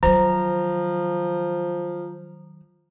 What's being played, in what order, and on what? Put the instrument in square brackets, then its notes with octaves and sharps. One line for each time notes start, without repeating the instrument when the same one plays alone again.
[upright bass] D#3 F#3 [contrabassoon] F3 [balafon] C5 [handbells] A#5